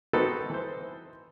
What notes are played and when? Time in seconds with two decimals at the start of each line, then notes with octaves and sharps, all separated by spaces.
0.13 B3 C4 D#4 F#4 A4 B4
0.50 E3 C5